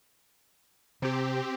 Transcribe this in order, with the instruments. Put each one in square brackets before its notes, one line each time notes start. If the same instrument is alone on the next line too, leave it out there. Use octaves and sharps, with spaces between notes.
[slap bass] C3 [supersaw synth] C4 G4